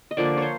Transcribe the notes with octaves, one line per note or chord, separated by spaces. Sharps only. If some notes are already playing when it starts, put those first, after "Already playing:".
D#5
D3 F3 A#3 D5
C5 C#5